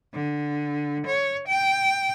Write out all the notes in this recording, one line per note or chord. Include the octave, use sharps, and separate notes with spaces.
D3
C#5
G5